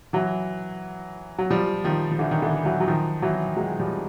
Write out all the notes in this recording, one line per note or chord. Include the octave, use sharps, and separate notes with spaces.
E3 F#3
F#3
F3 G3
D#3 F3
F3
D3 E3
D#3
D3 E3
E3 F#3
F#3
D#3 F3
E3 F#3
F#3 G#3
F3 G3